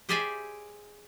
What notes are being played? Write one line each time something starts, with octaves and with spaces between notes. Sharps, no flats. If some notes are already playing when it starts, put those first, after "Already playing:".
G4 G#4 C5 D5 E5 G#5